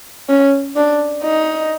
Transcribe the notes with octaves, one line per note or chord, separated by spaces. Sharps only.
C#4
D4
D#4